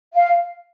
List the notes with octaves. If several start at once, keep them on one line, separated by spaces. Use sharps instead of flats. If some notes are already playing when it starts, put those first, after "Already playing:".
F5